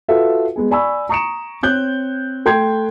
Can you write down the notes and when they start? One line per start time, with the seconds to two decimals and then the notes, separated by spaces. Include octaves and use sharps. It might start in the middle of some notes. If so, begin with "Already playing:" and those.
0.08 F4 F#4 A4 B4 E5 F5
0.56 G#3 B3 G#4
0.71 D5 G#5 B5 C#6 E6
1.09 A#5 C#6 D#6 C#7 D7 E7
1.63 C4 C#5 F#6 G6
2.45 A3 G5 C6 G6 G#6